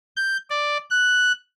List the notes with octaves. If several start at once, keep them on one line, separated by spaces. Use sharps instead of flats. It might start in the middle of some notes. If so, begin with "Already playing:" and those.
G6
D5
F#6